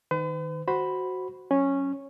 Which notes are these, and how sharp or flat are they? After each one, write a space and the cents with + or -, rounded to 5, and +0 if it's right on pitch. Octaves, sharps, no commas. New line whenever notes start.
D#3 +0 B4 +45
F#4 +0 C5 +0 B5 +0
F#3 +0 C#4 -10